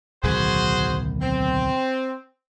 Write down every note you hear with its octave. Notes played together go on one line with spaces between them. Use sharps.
D1 B1 D#3 F#4 G#4 C5
C4